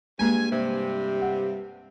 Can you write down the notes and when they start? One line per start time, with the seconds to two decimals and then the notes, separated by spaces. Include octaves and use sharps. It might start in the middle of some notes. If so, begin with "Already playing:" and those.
0.19 G2 G#3 A#3 G#4 G#5
0.51 G2 C3
1.22 F#5